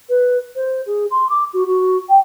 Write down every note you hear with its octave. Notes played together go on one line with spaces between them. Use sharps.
B4
C5
G#4
C6
D6
F#4
F#4
G5